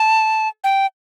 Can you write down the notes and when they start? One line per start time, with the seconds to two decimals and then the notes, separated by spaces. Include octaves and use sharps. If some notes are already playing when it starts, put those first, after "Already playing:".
Already playing: A5
0.64 G5